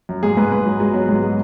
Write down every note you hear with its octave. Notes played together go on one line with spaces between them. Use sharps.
F#2
G#2 G#4
G#2 B4
G#2 B4
F#3
F#3 G#3
F#3 B3
G#2 G#3
F#3 G#3